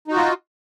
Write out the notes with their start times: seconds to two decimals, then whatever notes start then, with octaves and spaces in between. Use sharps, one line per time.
0.08 D#4
0.12 F#4
0.16 F4